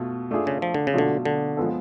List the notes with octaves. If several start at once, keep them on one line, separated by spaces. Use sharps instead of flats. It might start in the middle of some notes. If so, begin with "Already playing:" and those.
Already playing: B2 A3 F4
A3 D4 F4 G#4
C#3
F3
D3
C#3
B2 D3 F#3 A3 D4 F4
D3
F3 G#3 B3 F4 A4